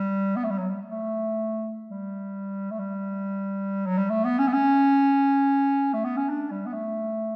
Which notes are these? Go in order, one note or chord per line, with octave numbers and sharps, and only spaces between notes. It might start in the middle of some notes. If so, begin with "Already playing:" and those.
Already playing: G3
B3
A3
G3
F#3
G3
A3
G3
A3
G3
F#3
G3
A3
B3
C#4
B3
C#4
A3
B3
C#4
D4
G3
B3
A3